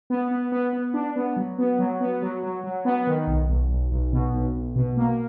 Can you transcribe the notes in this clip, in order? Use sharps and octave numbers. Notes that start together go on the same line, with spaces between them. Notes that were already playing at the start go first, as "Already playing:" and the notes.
B3
B3
B3
B3
D4
B3
F#3
B3
F#3
B3
F#3
F#3
F#3
B3
D#3
B1
B1
B1
B1
B2
B1
B1
B2
A#3